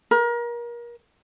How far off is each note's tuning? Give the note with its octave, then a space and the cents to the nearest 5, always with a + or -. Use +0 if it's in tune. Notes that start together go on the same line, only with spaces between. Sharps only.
A#4 +30